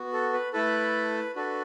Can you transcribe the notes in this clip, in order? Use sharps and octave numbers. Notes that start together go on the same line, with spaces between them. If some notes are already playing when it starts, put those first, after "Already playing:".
Already playing: B3 F#4
A4
B4
A3 E4 A4 B4
D4 F#4 A4 B4